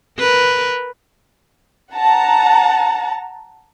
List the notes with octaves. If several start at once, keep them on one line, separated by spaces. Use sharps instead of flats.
A#4 B4
F#5 A5 A#5